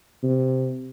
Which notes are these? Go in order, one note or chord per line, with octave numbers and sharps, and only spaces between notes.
C3